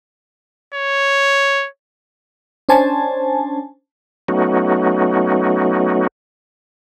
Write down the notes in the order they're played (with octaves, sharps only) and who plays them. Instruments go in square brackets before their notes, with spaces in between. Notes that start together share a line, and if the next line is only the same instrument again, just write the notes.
[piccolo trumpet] C#5
[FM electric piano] C#4 D4 C5 G#5 A5
[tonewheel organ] F#3 A3 B3 C#4 D#4 F#4